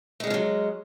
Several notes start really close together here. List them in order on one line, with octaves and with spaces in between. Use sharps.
A3 G#3 C#4 F3 F#3